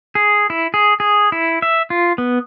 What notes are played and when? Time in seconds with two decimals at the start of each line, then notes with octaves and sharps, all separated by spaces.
0.15 G#4
0.50 E4
0.74 G#4
1.00 G#4
1.32 E4
1.62 E5
1.90 F4
2.18 B3